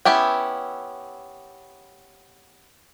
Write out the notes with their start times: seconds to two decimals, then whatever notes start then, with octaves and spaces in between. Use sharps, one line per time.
0.05 B3 C#4 E4 G4 G5